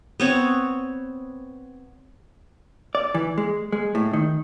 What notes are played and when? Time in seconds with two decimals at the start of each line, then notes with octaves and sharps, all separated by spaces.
0.20 B3 C4 C#5
2.95 D5
3.14 E3
3.38 G#3
3.72 G#3
3.95 A2
4.13 D#3